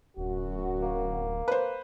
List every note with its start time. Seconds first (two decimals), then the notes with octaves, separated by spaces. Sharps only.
0.18 D1 F#2 F#4
0.82 A#3
1.48 B4 C5